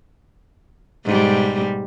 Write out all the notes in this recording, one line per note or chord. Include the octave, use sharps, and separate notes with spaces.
G#2 B2 G3